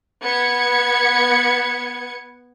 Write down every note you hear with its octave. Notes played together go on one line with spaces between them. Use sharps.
B3 G#6 C#7